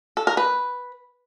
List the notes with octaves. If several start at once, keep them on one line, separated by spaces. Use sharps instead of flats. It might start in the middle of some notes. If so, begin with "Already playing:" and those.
A4
A#4
B4